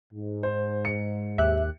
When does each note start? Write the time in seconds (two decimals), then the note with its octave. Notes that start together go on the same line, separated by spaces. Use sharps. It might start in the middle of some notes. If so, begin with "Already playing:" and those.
0.13 G#2
0.43 C5
0.85 C#7
1.38 D#2 G4 E5 F#6